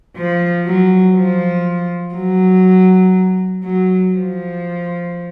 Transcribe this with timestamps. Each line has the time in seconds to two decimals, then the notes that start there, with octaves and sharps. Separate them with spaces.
0.16 F3
0.66 F#3
1.15 F3
2.15 F#3
3.64 F#3
4.14 F3